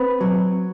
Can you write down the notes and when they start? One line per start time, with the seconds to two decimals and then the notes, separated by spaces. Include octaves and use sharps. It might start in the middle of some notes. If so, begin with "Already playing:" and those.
Already playing: C4 B4
0.21 F#3